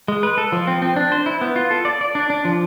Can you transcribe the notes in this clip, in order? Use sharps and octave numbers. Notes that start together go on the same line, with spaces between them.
G#3
B4
A4
F3
C4
C4
D4
C5
E4
B3
F4
A4
D5
D5
D4
D4
F3